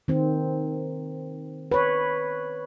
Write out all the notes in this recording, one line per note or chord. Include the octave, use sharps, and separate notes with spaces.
D#3 C4
B4 C#5